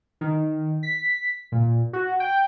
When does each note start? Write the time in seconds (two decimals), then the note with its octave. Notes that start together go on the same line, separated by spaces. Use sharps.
0.21 D#3
0.83 B6
1.52 A#2
1.93 F#4
2.20 G5